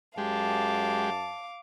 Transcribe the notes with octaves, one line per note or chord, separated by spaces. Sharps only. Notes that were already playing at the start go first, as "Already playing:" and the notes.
F#2 G#3 G4 F5 A5 D6